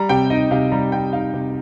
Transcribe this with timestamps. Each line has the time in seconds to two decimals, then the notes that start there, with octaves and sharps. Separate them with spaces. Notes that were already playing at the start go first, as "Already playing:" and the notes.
Already playing: G3 A#5
0.09 C3 G5
0.30 D#4 D#5
0.51 C3 F5
0.72 G3 A#5
0.92 C3 G5
1.13 D#4 F5
1.34 C3